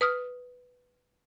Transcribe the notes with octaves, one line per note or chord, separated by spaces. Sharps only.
B4 D#6 F6